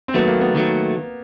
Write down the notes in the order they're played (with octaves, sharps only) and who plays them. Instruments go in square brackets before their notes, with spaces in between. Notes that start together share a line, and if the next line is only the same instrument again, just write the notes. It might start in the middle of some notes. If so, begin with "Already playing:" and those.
[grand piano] C4
[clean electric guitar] D#2 D#3 F#3 A3 [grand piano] B3
[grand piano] A#3
B3
[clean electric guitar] D#2 D#3 F#3 A3